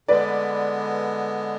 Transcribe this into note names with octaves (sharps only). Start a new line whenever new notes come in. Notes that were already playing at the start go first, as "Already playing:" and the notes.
D3 G#3 B3 B4 D5